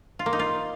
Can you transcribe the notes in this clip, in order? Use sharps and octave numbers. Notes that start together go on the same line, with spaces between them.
F4
A#3
D#4
F4